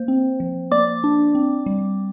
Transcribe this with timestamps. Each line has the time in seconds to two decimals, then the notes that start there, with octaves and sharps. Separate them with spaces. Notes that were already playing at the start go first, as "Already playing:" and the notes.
Already playing: A#3 C5
0.08 C4
0.40 F3
0.71 A#3 D5 D6
1.04 D4
1.35 C4
1.66 G3